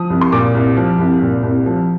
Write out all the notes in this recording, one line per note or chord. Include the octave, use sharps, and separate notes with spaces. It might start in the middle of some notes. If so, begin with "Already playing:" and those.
Already playing: F3 D#6
C2
C6
A#2 D6
C2
F3
C2
A#2
C2
F3